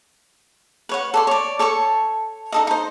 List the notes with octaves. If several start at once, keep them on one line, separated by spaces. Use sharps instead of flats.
B4 C#5 F#5
A4 D5 C6
C#5 D5
A4 C#5 A5 C#6
D#4 A4 D#5
D#4 C5